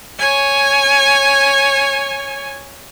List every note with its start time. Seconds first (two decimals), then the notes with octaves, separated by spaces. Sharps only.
0.19 C#5 G#5